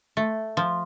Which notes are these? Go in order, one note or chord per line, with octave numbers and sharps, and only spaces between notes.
A3
F3